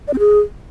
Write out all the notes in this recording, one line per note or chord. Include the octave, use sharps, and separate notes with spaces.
D5
C4
G#4